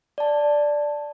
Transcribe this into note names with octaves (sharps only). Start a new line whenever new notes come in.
D5 A5